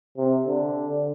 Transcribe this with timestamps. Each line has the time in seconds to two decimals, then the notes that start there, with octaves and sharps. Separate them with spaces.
0.17 C3
0.47 D3